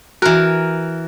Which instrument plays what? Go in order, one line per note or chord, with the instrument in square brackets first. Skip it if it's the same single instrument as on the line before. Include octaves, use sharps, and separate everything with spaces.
[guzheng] E3 A#4 [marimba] F#4